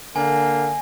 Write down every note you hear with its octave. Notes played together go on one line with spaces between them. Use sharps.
D3 A#3 G#5